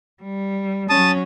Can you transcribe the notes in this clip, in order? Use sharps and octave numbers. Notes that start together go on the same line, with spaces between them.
G3
F#3 C#4 A5 D#6